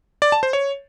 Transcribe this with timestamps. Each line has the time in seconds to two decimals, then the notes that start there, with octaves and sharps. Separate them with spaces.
0.22 D5
0.32 A5
0.43 C5
0.53 C#5